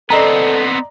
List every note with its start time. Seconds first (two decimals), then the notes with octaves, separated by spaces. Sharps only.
0.10 B3 C4 A4 D5 D#5 A#5